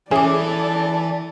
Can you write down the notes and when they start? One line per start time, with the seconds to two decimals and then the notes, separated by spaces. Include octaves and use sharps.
0.11 E3 C#4 G#4 A4 D5 E5 D6